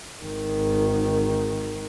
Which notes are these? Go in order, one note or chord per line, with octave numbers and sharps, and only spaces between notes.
G#1 D#3